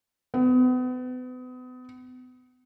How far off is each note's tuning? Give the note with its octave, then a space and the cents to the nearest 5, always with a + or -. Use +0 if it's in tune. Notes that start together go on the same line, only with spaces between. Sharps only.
B3 +35